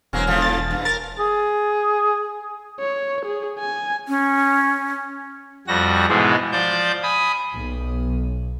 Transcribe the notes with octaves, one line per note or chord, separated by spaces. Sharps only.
E1 F#3 A#3 C4 C#4
A2 D3 F3
A6
G2
A#4 A6
G#4
C#5
G#4
G#5
C#4
F2 G3 F#4 A#6
G#2 B2 E3 G#3
F3 C5 D5 G6
G#5 B5 D#6
B1